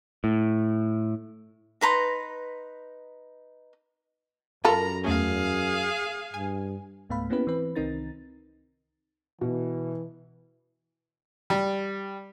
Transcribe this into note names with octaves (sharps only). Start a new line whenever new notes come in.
A2
D#4 B4 A#5 C6
F#2 F4 A4 A#4 A#5 B5
E2 A3 C#4 G#4 F5
G2 G#5
C#2 G#2 A3 B3 F5 B5
A#3 B3 C#4 E4 G4 B4
E3 C4 B4
C2 D#3 C4 D#4 A#4 A6
B2 E3
G3